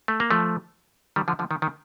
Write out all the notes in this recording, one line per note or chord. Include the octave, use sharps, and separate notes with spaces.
A3
A#3
F3 A3
D#3 G3
D3 F3
D3 F3
D#3
D#3